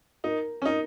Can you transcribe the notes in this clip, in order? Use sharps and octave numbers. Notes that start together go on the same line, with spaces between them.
D#4 A#4
C#4
D#4 A#4